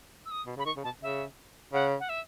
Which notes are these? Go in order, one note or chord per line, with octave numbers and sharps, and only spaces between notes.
E6
D#6
B2
C#3 B5
D#3 C#6
C#3
B2 A5
C#3 E5
C#3 F#5
F#5
E5